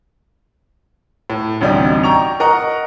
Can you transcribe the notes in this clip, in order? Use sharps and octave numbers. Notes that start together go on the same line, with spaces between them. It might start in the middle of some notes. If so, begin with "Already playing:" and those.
A2
A1 D2 C3 G3 D#4 G5
G5 A#5 C#6 F7
A#4 D#5 F#5 A#5 C#6